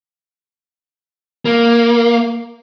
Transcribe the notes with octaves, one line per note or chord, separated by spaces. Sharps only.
A#3